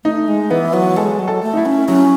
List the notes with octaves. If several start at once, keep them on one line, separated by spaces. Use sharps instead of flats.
A3 D#4
G#3
E3 B3
F#3
G#3 A4
F#3
A4
A3
D#4
E4
C#4
F#3 C#4